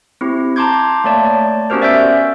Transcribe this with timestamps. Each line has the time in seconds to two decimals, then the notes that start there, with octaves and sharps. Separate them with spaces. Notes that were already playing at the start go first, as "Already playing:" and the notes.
0.21 C4 E4 G4
0.56 A5 A#5 C6 D6 G6 G#6
1.04 A3 A#3 C#5 D5 A5 G#6
1.25 D5
1.70 B3 C#4 F#4 G4 A#4 C5
1.82 D5 E5 E6 G6 D7